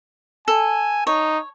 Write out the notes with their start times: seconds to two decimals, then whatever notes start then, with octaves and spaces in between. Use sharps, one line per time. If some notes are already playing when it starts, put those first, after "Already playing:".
0.48 A4 G#5
1.07 D#4 C#5